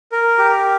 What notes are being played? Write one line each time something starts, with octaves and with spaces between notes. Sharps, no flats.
A#4
G4